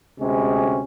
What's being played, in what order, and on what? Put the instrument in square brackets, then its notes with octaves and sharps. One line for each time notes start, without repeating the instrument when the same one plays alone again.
[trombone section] D2 C3 G#3 C#4